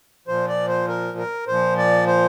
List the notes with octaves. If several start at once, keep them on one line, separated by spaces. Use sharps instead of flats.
A#2 F3 C5
D5
C5
A#4
A#4
A#2 F3 C5
D5
C5